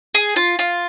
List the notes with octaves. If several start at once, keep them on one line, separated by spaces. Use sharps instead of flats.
G#4
F4
F4